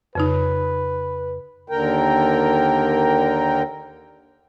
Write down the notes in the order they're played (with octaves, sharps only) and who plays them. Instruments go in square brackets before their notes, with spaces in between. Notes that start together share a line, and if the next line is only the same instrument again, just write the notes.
[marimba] F2 C#3 D#4 [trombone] B4
[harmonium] D#2 D3 A#4 G5